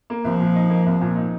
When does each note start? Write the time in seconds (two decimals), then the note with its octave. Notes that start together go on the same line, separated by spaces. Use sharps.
0.10 A#3
0.24 C2 F3
0.40 A#2
0.55 D#4
0.70 A#3
0.86 C2
1.01 A#2
1.16 D#4